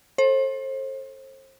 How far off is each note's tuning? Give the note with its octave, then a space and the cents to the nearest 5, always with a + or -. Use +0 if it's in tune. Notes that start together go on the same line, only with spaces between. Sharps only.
A4 +0 C5 +35